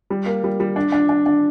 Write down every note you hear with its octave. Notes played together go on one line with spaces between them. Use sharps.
G3
A#3
G3
G3
D4
D4
D4
D4